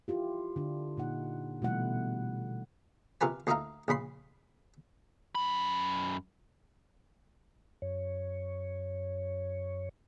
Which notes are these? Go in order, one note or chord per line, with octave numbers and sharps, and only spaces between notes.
E4 F4 G4
D3 D4
A#2 D#4 F#5
B2 E3 G3 A3 E4 F#5
C3 F4 A#4 B4 G#5
D2 A#3 D#4 E4 F5 A#5
A#1 C#3 B5 C6
F#2 B5
F#2 C#5